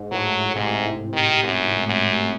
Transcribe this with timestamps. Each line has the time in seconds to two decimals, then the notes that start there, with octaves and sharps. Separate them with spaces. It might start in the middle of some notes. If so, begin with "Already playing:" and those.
Already playing: G#2
0.12 A2 F#3
0.56 G#2 C3
1.13 D#3
1.44 F#2
1.87 F#2